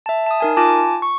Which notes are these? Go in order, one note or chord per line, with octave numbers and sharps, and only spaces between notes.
E5 A5
A5 D#6
D#4 A#4 G#5
F4 G#5 A5 D6
C#6